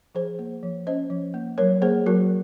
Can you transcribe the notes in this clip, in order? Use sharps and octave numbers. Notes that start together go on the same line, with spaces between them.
F3 G#4 C5
A#3
F3
C#4 C5 D#5
F3
A#3
F#3 A#4 C#5
A#3 G#4 C5
F#3 F#4 A#4